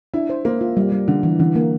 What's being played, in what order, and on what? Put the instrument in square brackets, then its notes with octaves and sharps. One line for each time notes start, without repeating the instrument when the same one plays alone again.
[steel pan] D4 [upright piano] E4
[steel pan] C5
[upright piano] A#3 [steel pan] C5
[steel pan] F4
G3
G3
[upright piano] D3 [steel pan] G3
[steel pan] E3
[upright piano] D3 [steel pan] E3
[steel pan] A#3